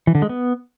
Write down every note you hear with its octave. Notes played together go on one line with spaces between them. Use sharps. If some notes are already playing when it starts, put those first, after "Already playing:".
E3
D3
G#3
B3